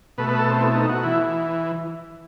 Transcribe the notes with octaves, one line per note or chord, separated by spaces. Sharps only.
B2 A3 B4
B4
A4
C4
E4
D#4
F#4
E3 E4